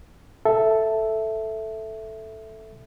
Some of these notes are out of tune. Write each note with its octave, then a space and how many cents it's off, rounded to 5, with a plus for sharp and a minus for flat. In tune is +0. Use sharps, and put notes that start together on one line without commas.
A4 +0 E5 +0